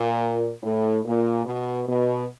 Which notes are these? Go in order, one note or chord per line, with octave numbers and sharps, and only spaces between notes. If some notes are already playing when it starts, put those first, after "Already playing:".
Already playing: A#2
A2
A#2
B2
B2